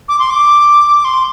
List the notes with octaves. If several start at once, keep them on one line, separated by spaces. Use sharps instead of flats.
D6
C6
D6
C6